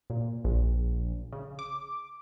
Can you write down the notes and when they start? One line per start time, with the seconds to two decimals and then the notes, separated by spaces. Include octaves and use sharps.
0.10 A#2
0.45 A#1
1.33 C#3
1.59 D6